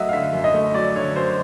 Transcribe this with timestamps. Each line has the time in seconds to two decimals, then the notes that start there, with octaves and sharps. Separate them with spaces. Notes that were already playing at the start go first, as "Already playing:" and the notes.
Already playing: F#2 F#3 A3 D#5 E5 F#5
0.09 F5
0.13 D3 E5
0.33 F#2
0.44 D#5
0.54 A3
0.74 F#3 D5
0.95 D3 C#5
1.16 F#2 C5